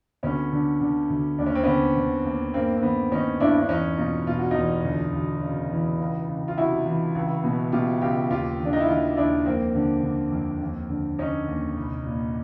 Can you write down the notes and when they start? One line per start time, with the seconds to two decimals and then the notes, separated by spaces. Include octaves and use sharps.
0.23 D2 B3 C#4
0.53 D3
0.81 D3
1.10 D2
1.39 D#2 D4
1.46 C#4
1.55 C4
1.63 D3 B3 C#4
1.96 D3
2.25 D#2
2.54 G2 A#3 C4
2.77 C4
2.83 D#3 B3
3.11 D#3 C#4 D#4
3.40 G2 D4 E4
3.61 D4
3.69 E2 C#4 D#4
3.98 B2 D#4 F4
4.27 B2 F4
4.39 F#4
4.51 D#4 F4
4.56 E2
4.85 D2
5.13 D2
5.42 C#3
5.71 E3
6.00 C#2
6.29 C#2
6.48 F4
6.58 C3 E4 F#4
6.86 E3
7.15 C#2
7.44 B2
7.72 B2 F4 G4
8.01 C#2 F4 G4
8.30 D#2 F4 G4
8.59 D#3
8.65 D4
8.73 D#4
8.80 E4
8.88 D#3 D#4 F4
9.17 D#2 D4 E4
9.46 F2 A#3 C4
9.75 D3
10.03 D3
10.32 F2
10.61 D#2
10.90 D3
11.19 D3 C#4 D#4
11.48 D#2
11.76 C2
12.05 A#2